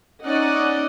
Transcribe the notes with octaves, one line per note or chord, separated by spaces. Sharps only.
C#4 D#4 D5 D#5 F#5